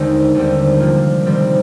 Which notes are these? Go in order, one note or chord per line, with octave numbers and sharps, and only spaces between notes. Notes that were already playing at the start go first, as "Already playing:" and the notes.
Already playing: D#2 D3 G#3 C4 D#4
D#2 D3 G3 C4
C3 F3 A#3 F4
C3 D#3 G3 C4